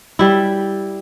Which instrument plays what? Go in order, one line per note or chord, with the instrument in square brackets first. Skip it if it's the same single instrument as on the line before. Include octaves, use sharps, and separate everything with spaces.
[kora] G3 E4